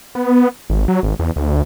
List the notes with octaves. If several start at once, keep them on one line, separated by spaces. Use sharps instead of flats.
B3
G#1
F#3
G#1
E2
D2